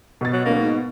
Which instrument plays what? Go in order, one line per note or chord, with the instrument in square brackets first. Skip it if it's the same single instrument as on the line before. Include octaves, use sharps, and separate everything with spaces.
[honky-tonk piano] B2 A6
[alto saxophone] F#3
[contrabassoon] D1 [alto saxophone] A#3
[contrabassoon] G#2